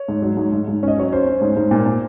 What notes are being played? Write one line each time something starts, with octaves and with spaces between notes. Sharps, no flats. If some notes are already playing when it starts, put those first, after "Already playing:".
Already playing: C#5
G#2
F#3
G#2
G#2
G#2
C#4 D#5
F#3 C#5
C#4 C5
C#4
G#2
G#2
A#2
A#2